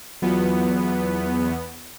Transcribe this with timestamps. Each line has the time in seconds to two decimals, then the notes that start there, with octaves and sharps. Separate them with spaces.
0.22 E2 F#3 B3 F4